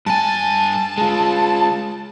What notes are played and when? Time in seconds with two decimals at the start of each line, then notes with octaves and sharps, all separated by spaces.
0.06 G2 G#5 A5
0.98 G#3 F4